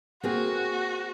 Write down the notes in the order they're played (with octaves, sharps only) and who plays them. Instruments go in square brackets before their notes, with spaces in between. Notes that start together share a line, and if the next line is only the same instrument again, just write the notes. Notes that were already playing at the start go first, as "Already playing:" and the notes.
[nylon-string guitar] A#3 C4 G#4 [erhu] F#4